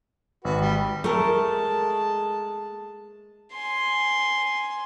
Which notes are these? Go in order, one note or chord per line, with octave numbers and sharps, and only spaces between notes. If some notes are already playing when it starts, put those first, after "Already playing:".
G#1 F#4 B4
G3
G#3 A3 A#4 A5
G#5 C6